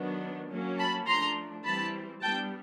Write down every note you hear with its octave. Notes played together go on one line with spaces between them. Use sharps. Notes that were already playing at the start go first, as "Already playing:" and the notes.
Already playing: D#3 F#3 B3 D4
F#3 A#3 C#4
A5 B5
F3 A3 D4 A#5 C6
E3 G3 C4 A5 B5
G3 B3 D4 G5 A5